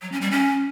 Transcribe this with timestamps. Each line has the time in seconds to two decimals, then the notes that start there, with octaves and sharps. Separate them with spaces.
0.02 F#3
0.12 C#4
0.22 G3
0.31 C#4